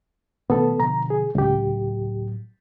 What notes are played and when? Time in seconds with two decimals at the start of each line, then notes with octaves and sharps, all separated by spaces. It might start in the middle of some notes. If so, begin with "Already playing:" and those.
0.50 B2 D#3 A3 B3 A4
0.80 B2 D3 F3 A#5
1.10 G#4
1.35 C#2 A2 F#3 G4